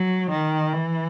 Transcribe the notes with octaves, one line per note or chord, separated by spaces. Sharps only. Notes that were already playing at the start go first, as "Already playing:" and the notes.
Already playing: F#3
D#3
E3